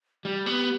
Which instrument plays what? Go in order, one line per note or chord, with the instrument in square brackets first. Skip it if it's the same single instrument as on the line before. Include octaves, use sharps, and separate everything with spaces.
[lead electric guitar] G3 [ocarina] G4
[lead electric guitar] B3